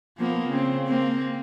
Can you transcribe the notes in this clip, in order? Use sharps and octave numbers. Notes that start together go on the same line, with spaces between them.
F3 A#3 B3
C#3 C4
A#3 C4